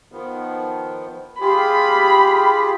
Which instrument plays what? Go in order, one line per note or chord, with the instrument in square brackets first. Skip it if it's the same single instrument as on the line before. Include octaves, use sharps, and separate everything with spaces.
[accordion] D#3 F3 B3
[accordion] F4 G4 G#4 [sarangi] B5